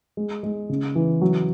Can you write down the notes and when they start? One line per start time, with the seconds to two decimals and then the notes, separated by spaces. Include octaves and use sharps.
0.17 G#3
0.43 G#3
0.69 C#3
0.95 E3
1.21 F#3